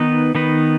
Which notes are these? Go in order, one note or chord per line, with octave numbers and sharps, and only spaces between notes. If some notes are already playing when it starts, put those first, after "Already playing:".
Already playing: D#3 B3 D#4 B4
D#3 B3 D#4 B4